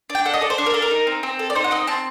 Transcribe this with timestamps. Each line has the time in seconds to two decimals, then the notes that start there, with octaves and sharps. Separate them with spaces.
0.10 D4
0.15 G5
0.25 A4 F#5
0.34 D#5
0.41 A4 D5
0.50 C5
0.58 D4
0.66 A#4
0.74 D4 A4
0.82 A#4
0.91 D#4
1.07 C4
1.23 C4
1.39 A4
1.50 D5
1.55 D#4 C5
1.64 F#5
1.71 C4 D#5
1.87 C4 A5